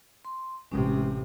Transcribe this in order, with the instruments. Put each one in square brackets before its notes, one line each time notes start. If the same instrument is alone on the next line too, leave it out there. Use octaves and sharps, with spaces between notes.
[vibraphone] C6
[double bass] A1 C3 [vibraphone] G#3 C#4